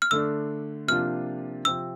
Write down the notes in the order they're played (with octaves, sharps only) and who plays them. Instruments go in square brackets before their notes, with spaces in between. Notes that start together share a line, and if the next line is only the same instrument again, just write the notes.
[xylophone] F6
[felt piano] D3 A3 D4 [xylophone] E6
[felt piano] C3 F3 A#3 D4 F4 [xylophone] F6
[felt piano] C3 F3 C4 [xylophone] E6